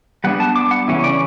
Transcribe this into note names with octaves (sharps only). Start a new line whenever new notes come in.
G3 B3 D4 F#5
A5
D6
F#5
C#3 E3 G3 C#4 E4
D5